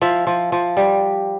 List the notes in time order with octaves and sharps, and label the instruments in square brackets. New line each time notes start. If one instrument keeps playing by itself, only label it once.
[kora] F3 E5
F3
F3
G3